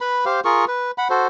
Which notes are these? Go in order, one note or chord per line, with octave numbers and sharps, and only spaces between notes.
B4 B5
G4 C5 F5
F4 G#4 A#4 C#6
B4
F#5 B5
F#4 A4 C5